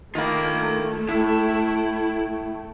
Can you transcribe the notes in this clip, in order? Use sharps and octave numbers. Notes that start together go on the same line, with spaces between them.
D#3 A3 A#3 F4 B5
A2 E4